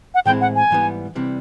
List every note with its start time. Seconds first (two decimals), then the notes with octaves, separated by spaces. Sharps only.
0.14 F#5
0.25 A2 E3 G#3 C4 E4 G5
0.41 F#5
0.56 G#5
0.71 G#2 E3 G3 B3
1.15 C3 E3 G3